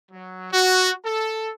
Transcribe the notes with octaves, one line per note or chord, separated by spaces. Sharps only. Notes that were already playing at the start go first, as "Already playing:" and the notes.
F#3
F#4
A4